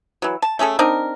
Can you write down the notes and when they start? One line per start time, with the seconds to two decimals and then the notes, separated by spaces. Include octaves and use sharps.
0.22 E3 F#3
0.42 A5
0.59 A3 C#4 G#4 A4
0.79 C4 D4 D#4 A#4